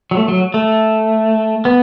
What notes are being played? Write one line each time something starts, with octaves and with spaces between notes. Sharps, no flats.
F#3
A3
F#3
A3
B3